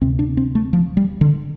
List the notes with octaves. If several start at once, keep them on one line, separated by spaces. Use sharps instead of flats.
D2 C3 C4
D4
C4
A3
F3
G3
D3